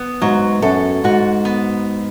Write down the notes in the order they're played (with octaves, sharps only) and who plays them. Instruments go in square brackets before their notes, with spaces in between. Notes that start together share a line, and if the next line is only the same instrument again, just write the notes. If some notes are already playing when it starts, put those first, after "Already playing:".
Already playing: [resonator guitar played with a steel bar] B3
[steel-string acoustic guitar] G#2 [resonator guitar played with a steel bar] F#3
[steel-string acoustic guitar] F#2 [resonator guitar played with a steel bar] A4
[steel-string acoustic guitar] G#2 [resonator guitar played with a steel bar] F#4
[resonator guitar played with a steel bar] B3